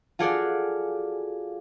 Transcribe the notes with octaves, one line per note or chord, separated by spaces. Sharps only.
F4 F#4 G#4 A4 D5